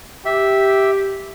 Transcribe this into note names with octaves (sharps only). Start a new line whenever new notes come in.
G4 E5